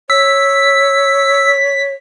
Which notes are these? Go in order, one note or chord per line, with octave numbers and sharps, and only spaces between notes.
C#5 E6 B6